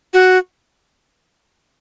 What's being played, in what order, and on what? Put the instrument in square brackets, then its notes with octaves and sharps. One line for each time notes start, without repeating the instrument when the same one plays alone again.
[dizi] F#4